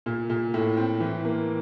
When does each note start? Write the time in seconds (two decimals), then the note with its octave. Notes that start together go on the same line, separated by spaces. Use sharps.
0.06 A#2
0.30 A#2
0.54 A2
0.77 C4
1.00 E3
1.24 A#3